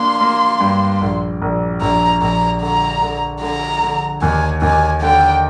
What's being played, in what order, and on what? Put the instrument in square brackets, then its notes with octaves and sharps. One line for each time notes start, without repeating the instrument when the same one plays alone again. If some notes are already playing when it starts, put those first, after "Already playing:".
Already playing: [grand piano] A#3 D4 [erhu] C6
[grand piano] A#3
G2
A#1
A#1
[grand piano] A#1 [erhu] A#5
[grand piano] A#1 [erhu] A#5
[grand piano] D3 [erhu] A#5
[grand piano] D3
[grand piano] D3 [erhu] A#5
[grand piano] D3
[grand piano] D#2 [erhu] G#5
[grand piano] D#2 [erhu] G#5
[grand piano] D3 [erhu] G5